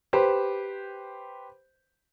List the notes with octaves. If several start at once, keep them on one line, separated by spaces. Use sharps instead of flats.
G4 B4 C5